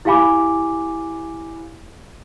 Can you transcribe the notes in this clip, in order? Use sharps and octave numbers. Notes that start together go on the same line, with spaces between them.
E4 G4 F5 G#5 B5 D6